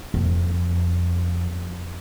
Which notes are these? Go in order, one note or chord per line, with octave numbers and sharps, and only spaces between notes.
F2